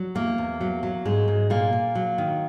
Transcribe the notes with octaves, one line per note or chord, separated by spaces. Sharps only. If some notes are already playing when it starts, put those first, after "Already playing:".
Already playing: F#3
E2 A#3
E2
F#3
F#3
G#2 G#3
G#2
A#2 A#3
A#2
F#3
D#3